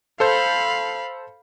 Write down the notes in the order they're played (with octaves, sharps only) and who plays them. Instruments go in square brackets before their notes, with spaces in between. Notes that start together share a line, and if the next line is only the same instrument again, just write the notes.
[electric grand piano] A4 C5 G6 [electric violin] F5 B5